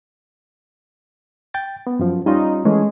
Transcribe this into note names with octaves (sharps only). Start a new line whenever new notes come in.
G5 A6
B3
F#2 F3
G3 C#4 D#4 F4
E3 G#3 A3 C#4